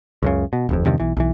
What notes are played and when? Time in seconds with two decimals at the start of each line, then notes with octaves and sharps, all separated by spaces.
0.23 C#2 F#2 C#3
0.53 B2
0.69 D1 A1 F2
0.85 E2 G2 C3 D#3
1.00 B1 E3
1.17 B1 E3